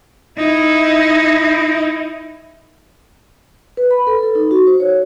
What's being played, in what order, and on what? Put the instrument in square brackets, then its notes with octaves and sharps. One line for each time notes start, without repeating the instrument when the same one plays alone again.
[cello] D#4 E4
[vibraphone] B4
B5
A4
A4
D#4
F#4
C5
C#5